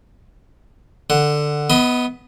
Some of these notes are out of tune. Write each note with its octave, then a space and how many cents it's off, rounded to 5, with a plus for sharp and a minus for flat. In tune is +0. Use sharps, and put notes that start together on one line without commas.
D3 +10 F#5 +0
B3 +0 D#5 +30 B5 +35